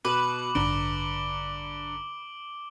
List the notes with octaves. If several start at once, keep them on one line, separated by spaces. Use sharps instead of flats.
B2 B4 D6 F#7
A1 G2 D3 A#5 D7 G7